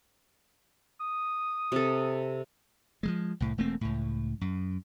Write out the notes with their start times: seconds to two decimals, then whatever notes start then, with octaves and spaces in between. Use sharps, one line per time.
1.01 D#6
1.72 C3 A4
3.03 F3 F#3 G#3
3.40 C2 A2
3.58 E1 A3 A#3 C4
3.81 C#2 A2
4.41 F#2